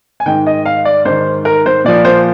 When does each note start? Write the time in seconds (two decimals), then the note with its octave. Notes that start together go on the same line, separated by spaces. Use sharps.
0.20 G#5
0.26 G#2 D#3 G5
0.47 D#5
0.66 F5
0.85 D5
1.05 G#2 D#3 C5
1.45 A#4
1.66 C5
1.85 A#2 F3 D5
2.05 C5